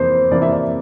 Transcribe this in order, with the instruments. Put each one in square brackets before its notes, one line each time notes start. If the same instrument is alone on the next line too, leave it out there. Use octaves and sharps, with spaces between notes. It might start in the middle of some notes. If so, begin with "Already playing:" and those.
Already playing: [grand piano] F2 C3 E3 A#3 [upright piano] C5
[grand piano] C3 E3 A#3 [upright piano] D5
[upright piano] E5
D5